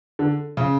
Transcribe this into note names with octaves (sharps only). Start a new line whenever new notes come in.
D3
C#3